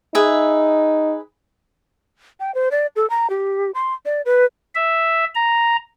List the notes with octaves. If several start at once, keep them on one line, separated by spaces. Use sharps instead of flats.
D#4 G#4 B4 E5
G5
C5
D5
A4
A#5
G4
C6
D5
B4
E5
A#5